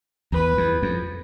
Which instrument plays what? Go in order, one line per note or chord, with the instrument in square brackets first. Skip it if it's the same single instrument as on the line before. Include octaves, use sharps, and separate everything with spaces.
[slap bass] E2 [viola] B4
[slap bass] E2
F2